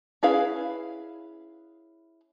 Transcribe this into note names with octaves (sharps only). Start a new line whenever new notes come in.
C#4 E4 G#4 B4 F5